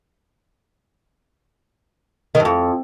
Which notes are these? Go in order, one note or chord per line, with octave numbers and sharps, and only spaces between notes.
D#3
G2
F2